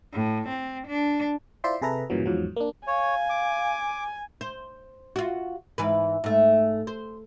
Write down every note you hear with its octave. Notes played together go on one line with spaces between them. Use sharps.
A2
C4
D4
E4 F4 C5 D5 E5 C6
C3 G#4 A4 B4 E5 A#5
G2 A#2 C#3 E3 F#3
E2 G#2 F3 F#3
A#3 D4
C#5 F5 G#5
D6
C5
F4 F#4
G#2 E3 B4
G#2 A3
C5